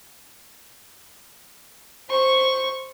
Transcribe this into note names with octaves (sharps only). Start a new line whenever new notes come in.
C5 C#6